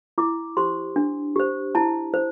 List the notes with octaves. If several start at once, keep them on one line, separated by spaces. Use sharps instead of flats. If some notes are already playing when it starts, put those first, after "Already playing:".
E4 D6
G4 C5 C6
D4
G4 C5
E4 A5
C5